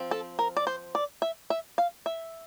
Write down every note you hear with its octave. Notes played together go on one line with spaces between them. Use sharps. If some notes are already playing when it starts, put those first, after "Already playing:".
Already playing: F3 C4
A4
A#4
D5
C5
D5
E5
E5
F5
E5